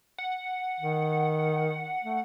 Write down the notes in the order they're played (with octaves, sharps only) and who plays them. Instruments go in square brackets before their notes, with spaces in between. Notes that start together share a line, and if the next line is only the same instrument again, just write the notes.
[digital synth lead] F#5
[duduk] D#3
A3